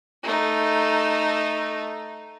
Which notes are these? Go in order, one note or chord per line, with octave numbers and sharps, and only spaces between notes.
A3 D#4